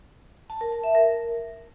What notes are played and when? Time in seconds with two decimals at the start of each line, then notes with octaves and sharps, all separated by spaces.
0.50 A5
0.61 A#4
0.72 A5
0.84 E5
0.95 A#4